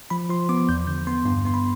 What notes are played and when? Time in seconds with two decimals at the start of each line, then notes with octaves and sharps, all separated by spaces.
0.10 F3 B5
0.30 F3 C6
0.49 B3 D6
0.69 E2 G6
0.87 D3 G6
1.07 B3 C6
1.25 G2 C6
1.45 B3 C6
1.54 B5